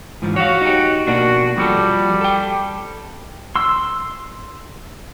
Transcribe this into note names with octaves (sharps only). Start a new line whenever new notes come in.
G#2 E3 F3
F#4 C#5 F5
D#4 G4
B2 A#3 D4 F#4
F3 G3 F#4 A4
A4 G5
C6 E6